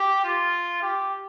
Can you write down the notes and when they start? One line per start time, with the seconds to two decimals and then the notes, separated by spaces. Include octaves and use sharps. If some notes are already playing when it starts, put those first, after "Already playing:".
Already playing: G4
0.24 F4
0.82 G4